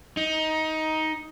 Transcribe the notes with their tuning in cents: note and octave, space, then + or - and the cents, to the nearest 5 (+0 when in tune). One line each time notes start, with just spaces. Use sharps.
D#4 +15